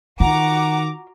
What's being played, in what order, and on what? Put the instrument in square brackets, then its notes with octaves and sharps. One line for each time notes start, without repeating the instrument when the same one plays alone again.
[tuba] D#3 [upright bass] F4 [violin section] F#4 A#5 D6 [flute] F#5